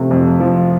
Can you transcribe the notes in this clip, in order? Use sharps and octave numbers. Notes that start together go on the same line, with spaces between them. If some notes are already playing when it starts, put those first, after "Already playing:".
Already playing: C3 F3 A3
F2
F3